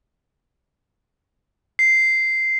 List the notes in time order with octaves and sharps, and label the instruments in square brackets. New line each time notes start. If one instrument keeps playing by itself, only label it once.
[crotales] C7